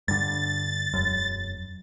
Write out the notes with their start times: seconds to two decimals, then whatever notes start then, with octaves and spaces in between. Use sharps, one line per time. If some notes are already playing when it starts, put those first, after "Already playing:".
0.08 G2 D3 A6
0.94 E1 F#2